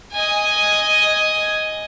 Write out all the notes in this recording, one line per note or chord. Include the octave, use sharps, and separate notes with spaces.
D#5 G#5